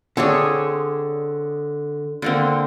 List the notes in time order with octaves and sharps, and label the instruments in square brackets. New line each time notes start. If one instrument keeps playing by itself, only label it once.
[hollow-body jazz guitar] D3 D5 [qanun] C4 G#4 C#5
[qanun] D3 A#3 C4